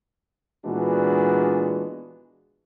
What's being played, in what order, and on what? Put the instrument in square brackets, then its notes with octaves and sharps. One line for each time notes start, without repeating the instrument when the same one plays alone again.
[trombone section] A#2 E3 G#3 B3 D4 F#4